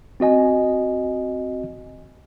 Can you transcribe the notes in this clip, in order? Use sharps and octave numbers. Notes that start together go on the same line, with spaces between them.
C4 F#4 D#5 G#5